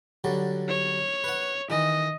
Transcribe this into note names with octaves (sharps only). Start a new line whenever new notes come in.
D3 F#3 G3
C#5
B4 F#5
D#3 E3 D#5